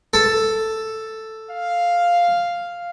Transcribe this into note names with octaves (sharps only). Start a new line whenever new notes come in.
A4
F5